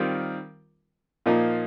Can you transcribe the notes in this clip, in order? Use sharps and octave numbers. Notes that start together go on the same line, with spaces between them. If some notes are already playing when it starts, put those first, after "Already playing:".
Already playing: D#3 G3 C4 F4 A#4
A#2 F3 A#3 D#4